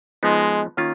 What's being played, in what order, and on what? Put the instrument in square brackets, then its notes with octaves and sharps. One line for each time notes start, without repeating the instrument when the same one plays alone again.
[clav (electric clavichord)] F3 B3 D#4 [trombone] G#3
[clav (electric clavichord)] D#3 A#3 C#4 F4